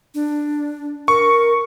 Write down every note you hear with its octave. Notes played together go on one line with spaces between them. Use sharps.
D4
A#4 C#6